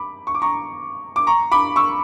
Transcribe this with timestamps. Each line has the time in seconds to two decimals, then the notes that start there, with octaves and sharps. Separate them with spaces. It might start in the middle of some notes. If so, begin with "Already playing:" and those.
Already playing: B5 D6
0.27 C#6
0.35 D6
0.42 A#5 C#6
1.16 D6
1.27 A#5 C#6
1.52 B5 D6
1.76 C#6 E6